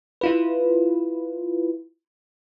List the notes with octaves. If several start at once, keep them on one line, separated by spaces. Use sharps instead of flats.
E4 F4 B4